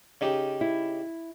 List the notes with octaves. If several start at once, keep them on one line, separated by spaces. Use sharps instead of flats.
C#3 D#4 G4
E4